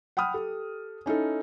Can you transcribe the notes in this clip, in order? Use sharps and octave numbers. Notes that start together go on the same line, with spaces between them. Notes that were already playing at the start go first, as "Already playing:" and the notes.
F#5 G5 B5 D#6 F6
G4 A4
C#4 D#4 E4 A4